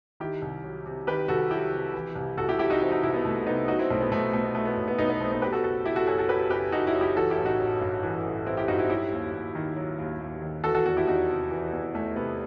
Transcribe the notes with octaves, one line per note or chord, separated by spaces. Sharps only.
D#3 E4 G4
C2
F#3
C3
D#3 G4 B4
C2 F#4 A4
F#3 E4 G4
C3
E3
C2
C2 F#4 A4
E4 G4
C3 E4 G4
D#4 F#4
E3 C4 E4
D#4 F#4
C2 C4 E4
B3
C2 A3
C3 B3 D#4
F#3 D#4 F#4
C4 E4
B1 A3 C4
B3
B1 A3
B2 A3
B3
F#3 A3
B3
B1
B3
B1 B3 D#4
B3
B2 A3 C4
B3 D#4
F#3 G4 B4
F#4 A4
F#1 F#4 A4
F#1 E4 G4
F#4 A4
F#2 F#4 A4
F#4 A4
F#3 G4 B4
F#1 G4 B4
F#1 D#4 F#4
E4 G4
F#2
E4 G4
E3 F#4 A4
E4 G4
A1
D#4 F#4
A1
G2
E3
A1
A1 C4 E4
E4 G4
G2 D#4 F#4
C4 E4
F#3 E4 G4
D#2
D#2
D#3
F#3
D#2
D#2
D#3
E3 F#4 A4
F#4 A4
E2 F#4 A4
E4 G4
E2 D#4 F#4
C3
E3
E2
E2 A3
C3 B3